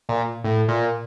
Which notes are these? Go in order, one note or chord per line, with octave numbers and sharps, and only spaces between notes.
A#2
A2
A#2